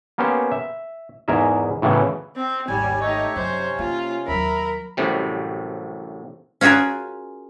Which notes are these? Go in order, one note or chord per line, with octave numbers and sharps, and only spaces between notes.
A#3 B3 C#4 G4 C5
E5
E2 G#2 G#4 A#4 E5
A2 C#3 E3 F#3 B3
C4
G#1 D#2 G3 C#5 G#5
A3 D#4 G4 C#5 E5
F#2 C3 C#4 C5
A#3 F4
D#2 F#3 A#4 E5 B5
A1 F#2 A2 C3 G3
C#4 F4 F#4 G#4 A#4